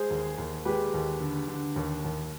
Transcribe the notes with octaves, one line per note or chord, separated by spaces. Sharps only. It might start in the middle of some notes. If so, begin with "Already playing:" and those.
Already playing: G#3 G#4 C5
D#2
D#2
G#3 G4 B4
D#2
D3
D3
D#2
D#2